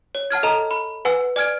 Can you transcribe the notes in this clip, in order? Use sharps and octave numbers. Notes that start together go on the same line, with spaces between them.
C#5
F#5 A5 F6 G#6
A4 D#5 A5 A#5
B5
B4 F#5 G#5 E6
D5 G#5 F6 G#6 D7